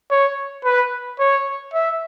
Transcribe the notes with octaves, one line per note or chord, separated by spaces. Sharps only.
C#5
B4
C#5
E5